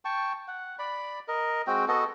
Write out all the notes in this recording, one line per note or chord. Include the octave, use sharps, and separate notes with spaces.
G5 A5 C#6
F#5
D5 B5
A#4 D#5
G#3 C4 F#4 G5
B3 F#4 A4 D#5